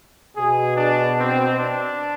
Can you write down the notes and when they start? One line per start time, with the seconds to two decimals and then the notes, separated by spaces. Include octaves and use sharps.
0.36 B2 G#4
0.77 D4
1.19 C4
1.59 D4